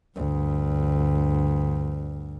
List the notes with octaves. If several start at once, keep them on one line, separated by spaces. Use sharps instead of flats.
D2 G2